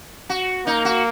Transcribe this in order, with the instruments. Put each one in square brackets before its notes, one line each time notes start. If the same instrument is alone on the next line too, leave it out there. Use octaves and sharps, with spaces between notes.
[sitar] F#4
[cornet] A#3 [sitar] D#4
[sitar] F#4